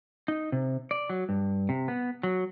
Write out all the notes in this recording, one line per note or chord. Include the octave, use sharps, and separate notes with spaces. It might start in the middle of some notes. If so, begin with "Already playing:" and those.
D#4
C3
D5
F#3
G2
C3
B3
F#3